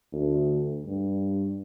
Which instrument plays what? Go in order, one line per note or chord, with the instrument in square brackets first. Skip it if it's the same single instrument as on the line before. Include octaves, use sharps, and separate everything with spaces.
[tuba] D2
G2